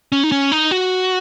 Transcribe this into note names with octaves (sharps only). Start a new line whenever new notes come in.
C#4
D#4
C#4
D#4
F#4